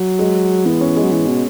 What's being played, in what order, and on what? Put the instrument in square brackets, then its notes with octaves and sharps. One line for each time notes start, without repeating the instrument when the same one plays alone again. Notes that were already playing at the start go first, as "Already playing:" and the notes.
Already playing: [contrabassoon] F#3
[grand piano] G#3
[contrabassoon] E3 [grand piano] B3
[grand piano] C#4
G#3
[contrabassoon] F#3
E3
B2